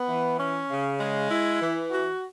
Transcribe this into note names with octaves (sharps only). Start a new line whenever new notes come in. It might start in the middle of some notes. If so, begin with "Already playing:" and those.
Already playing: B3
E3
C#4
C#3
G#3
E4
E3
F#4